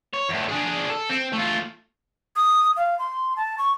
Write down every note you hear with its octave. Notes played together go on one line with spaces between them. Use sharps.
C#5
E2 A2
D4 G#4
A4
C4
A3 F4
D#6
F5
C6
A5
C#6